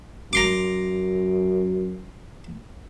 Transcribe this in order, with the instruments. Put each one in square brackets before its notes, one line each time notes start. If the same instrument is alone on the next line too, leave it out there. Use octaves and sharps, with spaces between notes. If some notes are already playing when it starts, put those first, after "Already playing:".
[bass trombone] F#2 [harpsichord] A#5 C6 D6